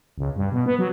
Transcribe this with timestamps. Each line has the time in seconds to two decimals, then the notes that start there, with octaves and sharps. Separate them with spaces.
0.18 C#2
0.36 G2
0.52 B2
0.66 B3
0.79 F#3